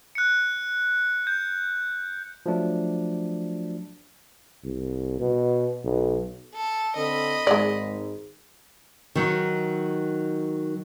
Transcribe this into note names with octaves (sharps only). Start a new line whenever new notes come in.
F#6 C#7
G6
F3 F#3 A3 D4
C2
B2
B1
A4
D3 C4 A4 D#5 B5
G#1 G#2 G#3 D5
D#3 F#3